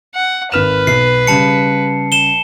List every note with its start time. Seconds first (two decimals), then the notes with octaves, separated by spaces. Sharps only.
0.15 F#5
0.52 G#1 B4 F6 E7
0.87 B1 C7
1.27 C#3 G3 A5 C#7
2.12 E7 G7